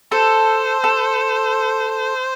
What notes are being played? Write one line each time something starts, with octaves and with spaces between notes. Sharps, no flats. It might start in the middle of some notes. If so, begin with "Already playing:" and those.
A4 C5
A4